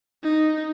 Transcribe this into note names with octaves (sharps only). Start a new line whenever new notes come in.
D#4